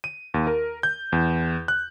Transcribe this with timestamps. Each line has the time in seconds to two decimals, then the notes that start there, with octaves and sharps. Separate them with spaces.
0.04 D#7
0.34 D#2
0.47 A#4
0.83 G6
1.12 E2
1.68 F#6